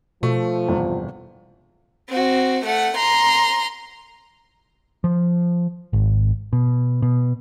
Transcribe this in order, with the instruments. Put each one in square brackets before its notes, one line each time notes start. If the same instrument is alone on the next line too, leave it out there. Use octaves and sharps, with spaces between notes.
[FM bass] B2 [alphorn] F3 [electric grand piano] A3 [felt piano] C#6
[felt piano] G1 E2 C3
[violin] C4 F#4
A3 F#5
A#5 C6
[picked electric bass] F3
G#1
B2
B2